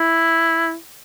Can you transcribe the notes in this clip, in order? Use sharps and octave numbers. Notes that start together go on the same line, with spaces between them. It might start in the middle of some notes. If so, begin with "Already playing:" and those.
Already playing: E4